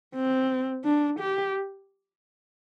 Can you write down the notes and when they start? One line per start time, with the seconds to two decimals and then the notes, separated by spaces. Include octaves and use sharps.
0.14 C4
0.85 D4
1.19 G4